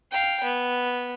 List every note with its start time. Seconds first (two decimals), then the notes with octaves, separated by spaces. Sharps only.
0.11 F5 G5
0.44 B3